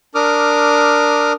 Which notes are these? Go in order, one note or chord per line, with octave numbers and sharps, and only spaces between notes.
D4 A#4 D6 D#6 F6